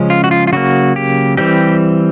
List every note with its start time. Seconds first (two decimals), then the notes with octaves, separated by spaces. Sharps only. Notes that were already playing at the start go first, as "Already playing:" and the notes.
Already playing: C#3 F3 G#3 C#4
0.10 F4
0.24 F#4
0.31 F4
0.47 F4
0.53 C#3 F#3 A#3 F#4
0.96 G4
1.37 E3 G3 C4 G4